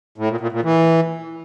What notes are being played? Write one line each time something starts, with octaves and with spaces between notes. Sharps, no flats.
A2
A#2
A#2
A#2
E3